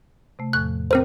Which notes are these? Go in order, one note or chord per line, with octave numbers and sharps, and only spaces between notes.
C3 A3
E2 A2 F3 F#6
C4 A#4 C5